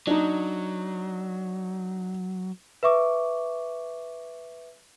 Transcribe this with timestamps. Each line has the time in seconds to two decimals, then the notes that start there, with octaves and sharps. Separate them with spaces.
0.07 F#3 D4 D#4
2.83 B4 E5 C#6 D6